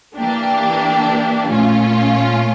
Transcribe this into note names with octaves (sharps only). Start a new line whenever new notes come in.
E3 A#3 D4 G4
A#2 A3 C#4 F4